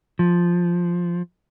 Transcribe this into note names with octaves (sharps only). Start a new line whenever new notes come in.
F3